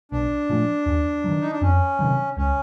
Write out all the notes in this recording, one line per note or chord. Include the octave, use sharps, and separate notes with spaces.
B1 D4
A#2 F3 A3
D#2
D#3 F#3
D#4
D4
F2 C#4
C3 D#3 F#3
C#2 C#4